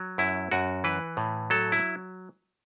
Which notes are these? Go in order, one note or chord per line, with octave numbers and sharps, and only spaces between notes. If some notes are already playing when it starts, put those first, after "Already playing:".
Already playing: F#3
F#2 E4
F#2 F#4
E3 B4
A2
F#3 A4
E4